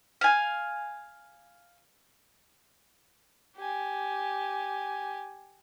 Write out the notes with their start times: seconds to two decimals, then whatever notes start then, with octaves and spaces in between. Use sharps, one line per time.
0.21 F5 G#5
3.57 G4 G#5